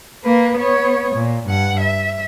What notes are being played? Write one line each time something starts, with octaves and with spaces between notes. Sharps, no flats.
A#3 B4
B3 C#5
A#2
G2 F#5
E5